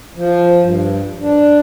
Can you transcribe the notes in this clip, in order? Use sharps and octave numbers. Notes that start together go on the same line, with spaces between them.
F3
G2
D4